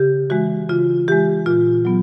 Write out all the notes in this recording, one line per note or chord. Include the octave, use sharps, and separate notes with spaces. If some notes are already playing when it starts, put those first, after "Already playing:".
Already playing: C#3 G4
E3 G#3 F#4
C#3 F4
E3 G#3 G4
A#2 F4
F#3 B3